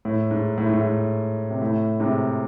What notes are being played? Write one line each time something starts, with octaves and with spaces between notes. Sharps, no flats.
A2
G#2
A2
G#2
A2
C3
A2
G#2 C3